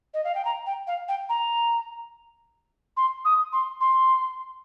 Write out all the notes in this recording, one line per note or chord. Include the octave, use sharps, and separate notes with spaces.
D#5
F5
G5
A#5
G5
F5
G5
A#5
C6
D#6
C6
C6